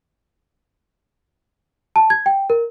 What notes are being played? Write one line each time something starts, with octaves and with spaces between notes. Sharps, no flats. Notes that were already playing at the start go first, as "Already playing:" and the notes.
A5
G#6
G5
A#4